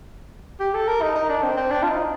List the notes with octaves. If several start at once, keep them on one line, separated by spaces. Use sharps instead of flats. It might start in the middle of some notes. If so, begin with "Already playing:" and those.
G4
A4
A#4
D#4
D#4
D4
C4
C4
D4
F4
D#4